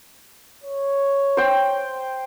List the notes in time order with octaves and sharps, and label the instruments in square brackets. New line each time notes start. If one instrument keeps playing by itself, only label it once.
[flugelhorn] C#5
[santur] C5 G5